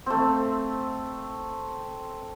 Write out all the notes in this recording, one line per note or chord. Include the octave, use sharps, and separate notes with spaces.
A3 C4